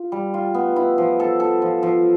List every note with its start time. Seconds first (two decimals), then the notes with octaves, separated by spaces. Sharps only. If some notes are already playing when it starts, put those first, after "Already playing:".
Already playing: F4
0.12 G3
0.34 F4
0.54 B3
0.76 E4
0.98 F3
1.20 A4
1.40 A4
1.62 F3
1.83 F3